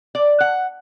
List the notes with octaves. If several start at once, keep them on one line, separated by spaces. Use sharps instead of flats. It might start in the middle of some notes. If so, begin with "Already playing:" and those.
D5
F#5